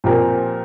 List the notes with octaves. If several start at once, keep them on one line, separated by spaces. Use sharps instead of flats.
A#2 F3 C4 G4 A#4